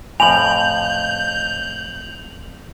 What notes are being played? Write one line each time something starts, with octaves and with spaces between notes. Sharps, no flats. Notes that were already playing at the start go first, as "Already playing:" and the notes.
F2 A2 G#5 G6 F7 F#7